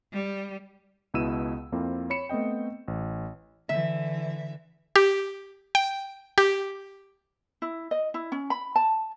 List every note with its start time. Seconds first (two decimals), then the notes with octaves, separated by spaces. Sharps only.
0.13 G3
1.14 C#2 B2 E4 E6 D#7 E7
1.72 F2 A#3 C4 E4 F4
2.10 C#5 B5 C#7 E7
2.29 A3 B3 C4 D#5 G5
2.88 A1
3.69 D3 E3 E5
4.96 G4
5.75 G5
6.38 G4
7.62 E4
7.91 D#5
8.14 E4
8.32 C#4
8.50 B5
8.76 A5